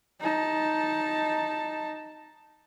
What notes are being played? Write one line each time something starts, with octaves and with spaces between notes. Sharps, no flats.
D#4 A5